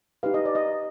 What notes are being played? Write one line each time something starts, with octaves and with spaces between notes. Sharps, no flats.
D#4 G4 B4 F5
D#5
D5
D#5